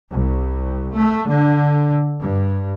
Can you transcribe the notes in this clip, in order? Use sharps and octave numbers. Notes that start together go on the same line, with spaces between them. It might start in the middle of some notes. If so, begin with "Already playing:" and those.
C2
A3
D3
G2